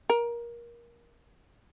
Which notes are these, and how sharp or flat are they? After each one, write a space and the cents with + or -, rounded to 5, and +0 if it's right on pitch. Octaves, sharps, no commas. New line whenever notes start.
A#4 +20